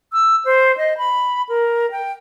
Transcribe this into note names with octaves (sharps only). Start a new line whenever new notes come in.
E6
C5
D#5
B5
A#4
G5